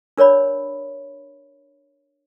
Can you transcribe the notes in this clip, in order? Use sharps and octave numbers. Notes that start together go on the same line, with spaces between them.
D4 A#4 C#5 D5 B5